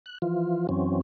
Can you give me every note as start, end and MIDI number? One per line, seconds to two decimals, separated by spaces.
0.06 0.18 90
0.22 0.67 52
0.22 0.67 53
0.22 0.67 65
0.69 1.01 42
0.69 1.01 52
0.69 1.01 54
0.69 1.01 60
0.69 1.01 61